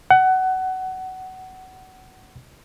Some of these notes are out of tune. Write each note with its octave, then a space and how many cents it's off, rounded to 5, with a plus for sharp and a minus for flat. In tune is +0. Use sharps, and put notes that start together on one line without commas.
F#5 +20